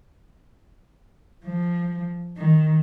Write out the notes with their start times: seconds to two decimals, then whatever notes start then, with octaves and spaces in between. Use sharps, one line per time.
1.45 F3
2.36 D#3